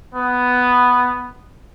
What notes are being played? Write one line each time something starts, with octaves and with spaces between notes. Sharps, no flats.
B3